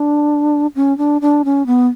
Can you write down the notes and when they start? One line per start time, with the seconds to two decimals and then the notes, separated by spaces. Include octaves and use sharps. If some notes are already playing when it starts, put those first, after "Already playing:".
Already playing: D4
0.75 C#4
0.98 D4
1.21 D4
1.45 C#4
1.67 B3